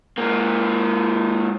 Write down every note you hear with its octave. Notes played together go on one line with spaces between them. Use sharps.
G#2 A#3